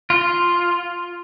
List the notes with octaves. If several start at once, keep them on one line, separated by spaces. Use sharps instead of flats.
F4